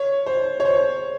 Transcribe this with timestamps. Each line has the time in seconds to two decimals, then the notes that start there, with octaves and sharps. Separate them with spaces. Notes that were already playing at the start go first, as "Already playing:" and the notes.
Already playing: C#5
0.26 C5
0.60 C#5
0.65 C5